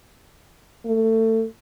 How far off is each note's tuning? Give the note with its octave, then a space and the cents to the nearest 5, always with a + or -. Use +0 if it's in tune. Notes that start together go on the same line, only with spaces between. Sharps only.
A3 +25